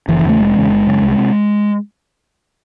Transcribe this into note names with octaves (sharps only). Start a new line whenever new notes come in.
F#1 E3
E3
E2 C#3 A3
F1 G#3
E2 C#3
G1
F#2 C#3
C2
C3